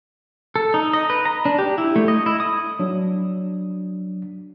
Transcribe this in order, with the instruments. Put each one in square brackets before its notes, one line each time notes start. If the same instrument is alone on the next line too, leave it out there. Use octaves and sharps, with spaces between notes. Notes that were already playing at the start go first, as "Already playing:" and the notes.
[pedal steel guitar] A4
D#4
D#5
B4
A#5
D4
G4
E4
A3
D#5
E4
D#6
[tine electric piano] F#3 D4